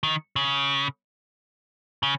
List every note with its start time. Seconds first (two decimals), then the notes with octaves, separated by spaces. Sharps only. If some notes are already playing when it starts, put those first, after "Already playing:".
0.03 D#3
0.36 C#3
2.03 C#3